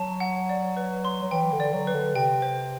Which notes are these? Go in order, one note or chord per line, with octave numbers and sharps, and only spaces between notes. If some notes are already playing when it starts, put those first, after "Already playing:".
Already playing: F#3 A5
F#5
D5
B4
C6
F#3
E3 G5
D3
D5
F#3
B4
D3
C3 G5
C5